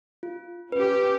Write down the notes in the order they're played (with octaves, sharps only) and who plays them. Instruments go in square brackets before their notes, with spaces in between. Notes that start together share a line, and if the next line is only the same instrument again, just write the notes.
[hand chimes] F4
[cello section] C#4 G4 [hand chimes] B4